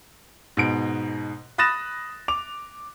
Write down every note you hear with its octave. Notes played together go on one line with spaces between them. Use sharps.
G#2 B2 D7
B5 D#6 F#6 A6 A#6 E7
D6 F7